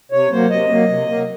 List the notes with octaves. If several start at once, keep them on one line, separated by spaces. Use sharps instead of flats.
C3 C#5
F#3 A#3 C5
C3 D#5
F#3 A#3
C3
F#3 A#3